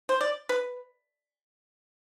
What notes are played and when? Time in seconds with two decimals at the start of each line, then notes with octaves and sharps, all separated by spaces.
0.09 C5
0.21 D5
0.49 B4